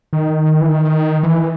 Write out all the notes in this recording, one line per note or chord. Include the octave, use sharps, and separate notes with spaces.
D#3
E3
D#3
E3